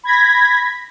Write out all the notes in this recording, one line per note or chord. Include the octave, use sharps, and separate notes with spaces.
B5 G#6 A#6 B6